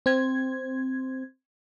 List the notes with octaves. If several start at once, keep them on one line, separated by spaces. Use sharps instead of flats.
C4 G#6